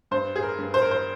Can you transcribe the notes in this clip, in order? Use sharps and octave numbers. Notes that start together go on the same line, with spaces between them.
G2 C5
G#4
A#4
G2
C5
A#4
C5